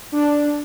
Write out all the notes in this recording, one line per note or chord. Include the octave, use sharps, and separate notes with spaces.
D4